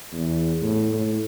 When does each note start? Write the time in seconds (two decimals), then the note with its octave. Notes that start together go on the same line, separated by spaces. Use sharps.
0.13 E2
0.62 A2
0.94 A2